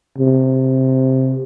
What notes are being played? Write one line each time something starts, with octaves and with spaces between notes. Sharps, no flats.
C3